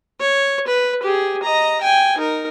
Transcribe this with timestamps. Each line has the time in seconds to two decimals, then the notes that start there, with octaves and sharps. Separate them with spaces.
0.20 C#5
0.67 B4
1.02 G4 G#4
1.43 D#5 A#5
1.81 G5 G#5
2.18 D#4 A#4